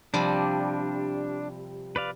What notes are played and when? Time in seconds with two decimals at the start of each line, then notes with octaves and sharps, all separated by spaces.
0.14 C3 F3 G3 D4
1.96 B4 D5 F5